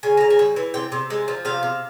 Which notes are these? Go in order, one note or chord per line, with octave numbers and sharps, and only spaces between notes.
C#3 G#5
C#3 A#5
G#5
G3
E3
C3 G5
C3
G#3
F3
C3 F5
C3